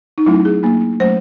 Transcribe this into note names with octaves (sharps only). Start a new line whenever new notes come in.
D#4
F#3 A3 C#4 E4
G#4
F#3 A#3 D4
F#3 A3 C#4 C5